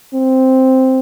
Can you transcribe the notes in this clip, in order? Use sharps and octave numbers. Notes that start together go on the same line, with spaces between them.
C4